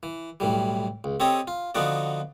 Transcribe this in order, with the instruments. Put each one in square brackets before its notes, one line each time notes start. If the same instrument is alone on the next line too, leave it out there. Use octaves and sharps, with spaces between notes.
[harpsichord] E3
B1 A2 E3 G3
C#2
C4 G4 A4 C#5 D#5 D#6
F4
D3 F3 B3 D#4 F#4 D5